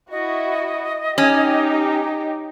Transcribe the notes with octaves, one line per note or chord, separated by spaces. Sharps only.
E4 F#4 D#5
C#4 D#4 G4